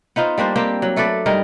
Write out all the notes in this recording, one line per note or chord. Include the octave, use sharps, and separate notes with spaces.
B3 D#4 F4 C5
G3 A#3 D4 C5
A#3 C4 G4
F#3
A3 A4 B4 D5
G2 G3 D#4 A#4